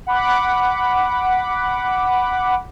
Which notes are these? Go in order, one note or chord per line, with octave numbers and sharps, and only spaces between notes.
F#5 B5 D6